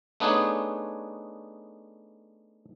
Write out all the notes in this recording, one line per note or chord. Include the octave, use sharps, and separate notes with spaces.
A3 B3 D4 D#4 G#4 C#5